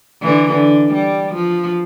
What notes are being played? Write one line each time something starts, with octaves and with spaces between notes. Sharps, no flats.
D3 E3
D3
G3
F3